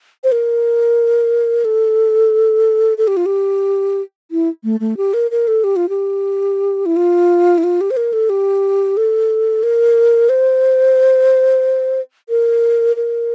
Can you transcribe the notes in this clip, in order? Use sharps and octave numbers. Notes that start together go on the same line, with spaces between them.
C5
A#4
A4
A4
G4
F4
G4
E4
A3
A3
G4
A#4
A#4
A4
G4
F4
G4
E4
F4
E4
F4
G4
C5
A#4
A4
G4
A4
A#4
C5
A#4
A#4